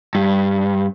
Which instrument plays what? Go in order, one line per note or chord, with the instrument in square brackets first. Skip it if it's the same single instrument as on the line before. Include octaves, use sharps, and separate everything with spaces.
[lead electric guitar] G2